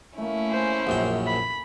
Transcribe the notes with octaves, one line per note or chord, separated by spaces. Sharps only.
A3 A#3 C#4 E4
G#4 A4 C5
A#1 F#2 G5
B5